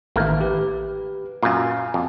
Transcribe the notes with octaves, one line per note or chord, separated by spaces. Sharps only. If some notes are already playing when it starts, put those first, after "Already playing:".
A1 D#3 A3 A#3 E5
G4 B4
F#2 A#2 F5 G#5
F2